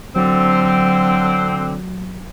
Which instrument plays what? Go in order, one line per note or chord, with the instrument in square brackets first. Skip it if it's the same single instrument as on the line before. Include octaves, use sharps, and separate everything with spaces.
[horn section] D3 C4 [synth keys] F#3